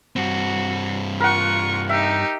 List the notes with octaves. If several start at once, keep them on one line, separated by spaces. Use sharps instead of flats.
G2 C4 F#4
F4 A#4 F#5 C#6
D#4 G4 E5